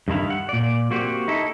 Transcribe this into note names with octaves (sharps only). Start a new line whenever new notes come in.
G2 D#3 E4 F5
F#5
A#2 D5
A#3 C4 F#4 G4
D#4 E4 A4